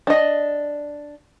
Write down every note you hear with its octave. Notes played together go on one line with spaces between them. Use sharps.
D4 D#5